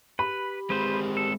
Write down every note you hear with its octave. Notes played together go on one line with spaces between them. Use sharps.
G4 B4 B5
G#3 C4 B4 C5
A4